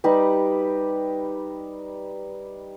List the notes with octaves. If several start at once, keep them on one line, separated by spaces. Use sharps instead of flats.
G3 D#4 G4 B4